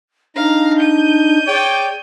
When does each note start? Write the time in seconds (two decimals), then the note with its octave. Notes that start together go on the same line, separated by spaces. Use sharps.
0.36 D4 D#4 F5 A#5
0.79 G6 D#7
1.47 G#4 C#5 D5 G5